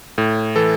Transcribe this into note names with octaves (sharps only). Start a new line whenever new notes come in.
A2
E3 A4